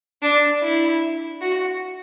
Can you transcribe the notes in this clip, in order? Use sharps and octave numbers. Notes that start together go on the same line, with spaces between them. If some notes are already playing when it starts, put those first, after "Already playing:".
D4
E4
F#4